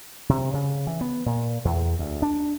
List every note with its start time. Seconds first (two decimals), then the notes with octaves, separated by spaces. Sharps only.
0.29 C3
0.53 C#3
0.87 E3
1.01 B3
1.26 A#2
1.65 E2
1.99 D2
2.22 D4